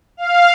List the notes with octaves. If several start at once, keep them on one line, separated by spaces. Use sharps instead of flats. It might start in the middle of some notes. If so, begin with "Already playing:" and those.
F5